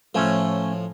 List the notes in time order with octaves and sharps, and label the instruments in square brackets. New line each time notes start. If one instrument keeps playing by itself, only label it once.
[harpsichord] A2 F3 [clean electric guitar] A3 C#4